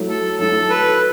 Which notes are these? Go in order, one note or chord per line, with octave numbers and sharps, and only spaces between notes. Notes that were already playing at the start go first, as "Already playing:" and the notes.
Already playing: F#3 A3 E4
A4
F#3 A3 E4 A4
B4